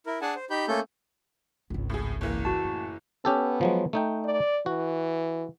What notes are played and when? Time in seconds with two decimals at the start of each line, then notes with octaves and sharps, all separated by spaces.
0.06 E4 A#4
0.21 D4 G#4 F#5 G#5 A5
0.35 C5
0.50 D#4 G4 B5 G6
0.68 A3 A#3 C#4 A4 G6
1.70 G#1 C#2
1.90 A2 G#4
2.21 F#1 E3 A#3
2.45 F#4 A5
2.65 A2
3.25 B3 C#4 G4 A4
3.61 F3 F#3 G#3
3.93 A3 D#4 G5
4.25 D5
4.66 E3 F#4